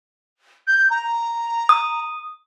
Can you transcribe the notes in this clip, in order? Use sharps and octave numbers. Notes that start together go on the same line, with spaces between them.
G6
A#5
D#6